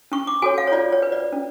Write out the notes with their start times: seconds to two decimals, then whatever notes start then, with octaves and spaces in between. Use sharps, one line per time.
0.12 C#4 C#6
0.27 D6
0.42 F#4 A4 C#5 G#5
0.58 F5
0.67 C#5
0.72 F4 D5
0.92 C#5
1.02 B4
1.12 D5
1.32 C#4